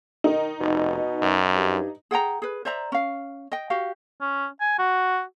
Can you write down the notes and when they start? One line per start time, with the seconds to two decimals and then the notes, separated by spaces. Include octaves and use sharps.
0.24 D#3 D#4
0.60 F1 B2
1.23 F#2
1.55 G2
2.11 G#4 F#5 G5 A#5
2.42 G#4 B4
2.65 C5 D5 E5 A#5
2.92 C#4 F5
3.52 D#5 G5
3.70 F#4 G4 F5
4.21 C#4
4.61 G#5
4.79 F#4